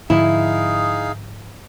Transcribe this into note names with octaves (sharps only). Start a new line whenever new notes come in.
G#2 D3 F3 D#4 E4 G#4 F5